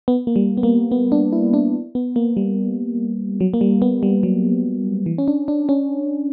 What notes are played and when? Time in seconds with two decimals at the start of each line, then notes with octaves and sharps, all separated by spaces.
0.08 B3
0.27 A#3
0.36 G3
0.57 B3
0.63 A#3
0.91 B3
1.12 D4
1.33 E4
1.54 D4
1.95 B3
2.16 A#3
2.37 G3
3.41 F#3
3.54 A#3
3.61 G3
3.82 B3
4.03 G3
4.23 F#3
5.06 E3
5.18 C#4
5.28 D4
5.48 D4
5.69 C#4